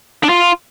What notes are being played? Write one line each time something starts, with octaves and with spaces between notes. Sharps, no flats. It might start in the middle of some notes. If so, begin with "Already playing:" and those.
D4
F4